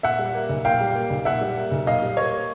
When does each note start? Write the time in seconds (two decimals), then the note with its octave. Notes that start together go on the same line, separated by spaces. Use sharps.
0.03 A#2 E5 F#5
0.19 G3
0.35 A#3
0.49 B1
0.65 A#2 F5 G5
0.81 G3
0.95 A#3
1.10 B1
1.25 A#2 E5 F#5
1.41 G3
1.57 A#3
1.71 B1
1.86 A#2 D#5 F5
2.02 G3
2.17 A#3 C#5 D#5